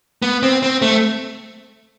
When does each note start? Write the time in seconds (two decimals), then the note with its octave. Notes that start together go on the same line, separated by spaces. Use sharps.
0.22 B3
0.43 C4
0.63 C4
0.82 A3